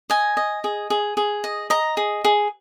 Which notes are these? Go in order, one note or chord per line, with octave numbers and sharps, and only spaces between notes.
D#5 G#5
D#5
G#4
G#4
G#4
D#5
D#5 A#5
G#4
G#4